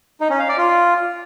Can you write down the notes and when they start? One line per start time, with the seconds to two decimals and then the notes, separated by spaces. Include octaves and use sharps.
0.21 D#4
0.30 C#4
0.39 F5
0.49 D5
0.58 F4